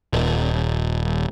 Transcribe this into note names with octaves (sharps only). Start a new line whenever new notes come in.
D#1